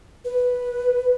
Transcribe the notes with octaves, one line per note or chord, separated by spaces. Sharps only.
B4